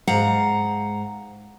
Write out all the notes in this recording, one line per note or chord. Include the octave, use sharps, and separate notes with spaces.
G#2 F5 F#5 A#5